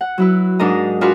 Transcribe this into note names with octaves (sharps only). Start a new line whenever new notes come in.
F#5
F#3 E4 B4
G#2 D4 D#4 A#4 D#5 A#5
D4 F4 F#4 G#4 A#4 B4